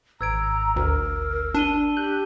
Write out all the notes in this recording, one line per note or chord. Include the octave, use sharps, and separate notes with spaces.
G#1 A#5 E6 G#6 D7
D2 A#4
D4 A5 D#7 G7
G4 F#6 G6